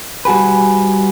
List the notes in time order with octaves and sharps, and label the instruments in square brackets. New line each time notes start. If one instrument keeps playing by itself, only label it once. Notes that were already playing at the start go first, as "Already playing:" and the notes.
[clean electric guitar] G3 F#4 G#4 B4